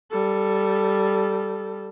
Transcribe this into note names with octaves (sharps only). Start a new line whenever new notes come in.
G3 A4